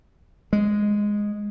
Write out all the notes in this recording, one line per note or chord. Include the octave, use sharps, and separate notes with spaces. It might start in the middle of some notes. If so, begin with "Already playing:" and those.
G#3